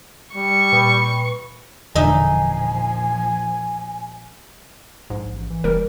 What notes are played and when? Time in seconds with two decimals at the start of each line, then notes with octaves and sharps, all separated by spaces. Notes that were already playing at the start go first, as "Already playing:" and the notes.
0.35 G3 C#6
0.72 A#2 B4 G5 D#6
1.95 E1 A#1 D3 F3 D#4 E5 G#5
5.10 A#1 G#2
5.33 A1
5.50 E3
5.64 F#1 G3 A#4